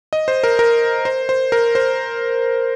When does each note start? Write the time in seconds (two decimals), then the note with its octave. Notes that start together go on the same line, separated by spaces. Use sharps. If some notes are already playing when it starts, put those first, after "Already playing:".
0.13 D#5
0.28 C5
0.44 A#4
0.59 A#4
1.05 C5
1.29 C5
1.52 A#4
1.75 C5